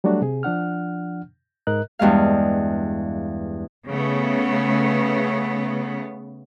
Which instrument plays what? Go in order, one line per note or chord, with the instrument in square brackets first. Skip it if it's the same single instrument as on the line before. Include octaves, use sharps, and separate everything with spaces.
[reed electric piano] F#3 G3 A3 D4 F#4
C3 G#4
F3 D4 F#5 F6
G#2 A#4 D#5 F#6
[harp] E2 G2 G#3 F5
[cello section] C#3 A3 B3